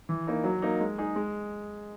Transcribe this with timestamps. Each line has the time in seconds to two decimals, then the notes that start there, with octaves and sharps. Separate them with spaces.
0.09 E3
0.27 A#3 D#4
0.44 F#3
0.62 A#3 D#4
0.80 G#3
0.98 D#4 G#4
1.16 G#3